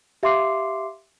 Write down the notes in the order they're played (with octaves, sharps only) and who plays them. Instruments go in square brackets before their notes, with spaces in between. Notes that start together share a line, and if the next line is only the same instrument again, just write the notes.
[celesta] G4 E5 F5 C6 D6 C7